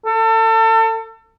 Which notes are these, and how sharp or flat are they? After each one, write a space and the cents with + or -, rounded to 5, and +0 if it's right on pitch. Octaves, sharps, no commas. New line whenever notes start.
A4 +30